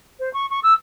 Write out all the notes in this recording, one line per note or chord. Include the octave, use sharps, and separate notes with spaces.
C5
C#6
C#6
E6